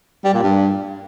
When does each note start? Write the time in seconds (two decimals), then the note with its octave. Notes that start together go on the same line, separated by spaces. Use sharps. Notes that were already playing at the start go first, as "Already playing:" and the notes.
0.24 G3
0.34 A#2
0.43 G2